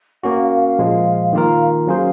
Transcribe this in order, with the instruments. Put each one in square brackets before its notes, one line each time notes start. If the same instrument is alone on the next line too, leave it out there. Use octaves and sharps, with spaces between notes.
[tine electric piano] A#3 C#4 F#4 [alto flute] F5
[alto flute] F5
F5
[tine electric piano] A#2 F3 G#3
[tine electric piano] D#3 A#3 F4 A#4 [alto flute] F5
[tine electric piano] F#3 C#4 G#4 C5 [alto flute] F5